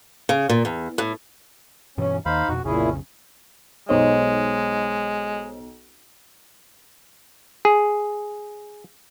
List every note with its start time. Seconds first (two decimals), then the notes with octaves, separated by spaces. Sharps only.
0.29 C#3
0.49 A#2
0.65 E2
0.98 A2
1.98 G2 B2 E3 C#4
2.26 D#2 D#3 D#4 C5 F5 B5
2.49 F2 B2 F#4
2.65 B1 F2 A#2 C#3 C#4 E4 G#4
3.89 B1 G#3 D#4 C5 C#5 D#5
7.65 G#4